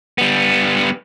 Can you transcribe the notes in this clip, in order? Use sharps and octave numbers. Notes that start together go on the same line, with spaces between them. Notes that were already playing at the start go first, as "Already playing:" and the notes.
G3 B3